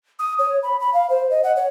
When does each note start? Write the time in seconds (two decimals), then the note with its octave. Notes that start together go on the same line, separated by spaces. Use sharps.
0.19 D#6
0.39 C#5
0.63 B5
0.80 B5
0.94 F5
1.10 C5
1.30 D#5
1.44 F#5
1.56 C#5